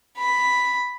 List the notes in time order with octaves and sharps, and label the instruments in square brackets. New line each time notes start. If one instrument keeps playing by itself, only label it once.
[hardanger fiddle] B5